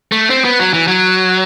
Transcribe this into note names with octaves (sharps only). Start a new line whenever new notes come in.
A3
C4
B3
F#3
E3
F#3